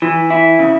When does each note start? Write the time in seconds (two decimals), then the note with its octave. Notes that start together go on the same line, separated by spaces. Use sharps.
0.02 E3
0.30 E4
0.59 C#3